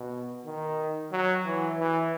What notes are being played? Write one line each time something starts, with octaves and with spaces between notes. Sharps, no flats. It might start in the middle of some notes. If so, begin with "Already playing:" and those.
Already playing: B2
D#3
F#3
E3
E3